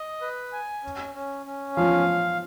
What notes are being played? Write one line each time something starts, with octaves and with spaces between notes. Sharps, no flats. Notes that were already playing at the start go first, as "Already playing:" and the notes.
Already playing: D#5
B4
G#5
C#4
C#4
C#4
F3 F5